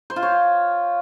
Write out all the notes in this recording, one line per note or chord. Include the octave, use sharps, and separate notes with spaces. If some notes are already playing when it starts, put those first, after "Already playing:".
C5
F4
C#5